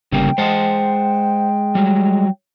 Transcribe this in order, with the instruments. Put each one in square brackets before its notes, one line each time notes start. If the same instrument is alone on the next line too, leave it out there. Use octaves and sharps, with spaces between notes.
[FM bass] G1 [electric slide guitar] C#3 G3 A#3 [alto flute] G5
[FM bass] G#3 [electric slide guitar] C5 F#5 A5
[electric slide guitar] F#3 G3